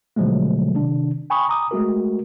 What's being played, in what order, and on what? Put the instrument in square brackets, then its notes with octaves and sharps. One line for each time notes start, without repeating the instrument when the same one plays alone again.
[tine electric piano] B2 D3 F3 F#3 G#3 A3
C3 D#3 D4
G5 G#5 B5 C#6 D#6
A#5 D6 D#6
G#3 A3 F#4 A#4